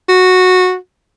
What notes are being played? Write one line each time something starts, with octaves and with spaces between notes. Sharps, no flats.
F#4